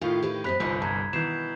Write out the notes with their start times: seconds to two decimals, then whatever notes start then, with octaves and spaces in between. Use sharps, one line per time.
0.01 A2 D#3 F4 G4 F5
0.23 G4 B4 D#5
0.44 F#2 C4 D#5 B5 F#6 B6
0.60 G1 C2 F3 D#4 D#5
0.82 G2 A5 A#5 G#6
1.13 B2 D#3 E3 G6 C7 E7